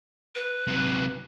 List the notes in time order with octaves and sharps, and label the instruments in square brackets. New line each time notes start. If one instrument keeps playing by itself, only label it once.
[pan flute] B4
[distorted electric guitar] C3 F#3